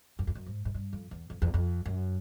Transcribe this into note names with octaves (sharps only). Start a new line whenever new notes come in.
F#2
F2
F#2
G#2
G#2
G2
F2
E2
F2
E2
F2
F#2